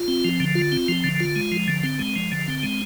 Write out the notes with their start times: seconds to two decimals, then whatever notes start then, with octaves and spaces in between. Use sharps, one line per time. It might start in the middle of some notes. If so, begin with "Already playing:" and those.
Already playing: F4
0.08 C4
0.25 F3
0.40 D3
0.55 F4
0.72 C4
0.88 F3
1.04 D3
1.20 F4
1.36 G#3
1.52 F3
1.68 D3
1.83 C4
1.99 G#3
2.16 F3
2.32 D3
2.48 C4
2.63 G#3